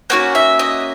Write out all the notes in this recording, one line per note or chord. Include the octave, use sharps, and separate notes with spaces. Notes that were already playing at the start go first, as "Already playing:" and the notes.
A#3 C#4 F#4 F#5
E5
D#5